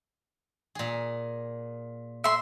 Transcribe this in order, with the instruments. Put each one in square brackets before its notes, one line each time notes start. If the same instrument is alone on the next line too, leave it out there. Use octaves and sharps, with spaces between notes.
[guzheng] A#2 G#4
[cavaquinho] E5 C6